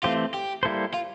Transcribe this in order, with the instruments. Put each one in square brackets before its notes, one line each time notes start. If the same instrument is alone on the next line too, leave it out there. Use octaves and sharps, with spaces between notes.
[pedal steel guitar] E3 A3 C4 G4 C5 [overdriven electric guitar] F4
[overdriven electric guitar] G4
[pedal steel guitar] G3 A#3 E4 A4 C5
[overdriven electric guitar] F4